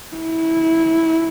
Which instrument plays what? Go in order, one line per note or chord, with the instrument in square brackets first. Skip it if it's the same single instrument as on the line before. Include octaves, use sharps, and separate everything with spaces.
[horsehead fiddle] E4